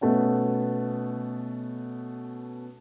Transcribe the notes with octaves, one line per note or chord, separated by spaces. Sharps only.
B2 A3 B3 C#4